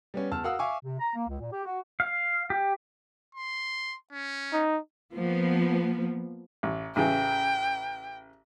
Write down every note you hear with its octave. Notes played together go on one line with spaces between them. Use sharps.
G3 B3 C#4
E2 A5 E6 F6
F#4 A#4 F5 F#5 D#6 E6
E5 F5 G#5 C#6 D6
C3
A#5
A#3
C#2
A#2
G4
F#4
F5
G4
C6
C#4
D#4
F3 A#3 B3
A1
A1 C#3 E3 G5